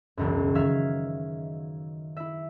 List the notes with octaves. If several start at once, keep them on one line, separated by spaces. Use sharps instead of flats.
E1 C#2 F#2
D#3 F#3 E5 F5 F6 G#6
E4 E5